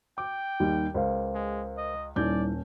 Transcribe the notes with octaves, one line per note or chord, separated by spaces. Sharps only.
G5 D6
D#2 D#3 G3
C#2 A#4 C5 F5
G#3
D#5
D#1 G3 C#4 D#4 E4 D5 G6